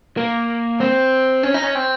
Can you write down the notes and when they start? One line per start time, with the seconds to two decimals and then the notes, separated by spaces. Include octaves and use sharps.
0.17 A#3
0.80 C4
1.43 C#4
1.54 D#4
1.64 C#4
1.75 C4